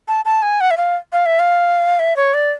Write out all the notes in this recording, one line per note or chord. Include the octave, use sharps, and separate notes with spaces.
A5
A5
G#5
F#5
E5
F5
F5
E5
F5
E5
C#5
D5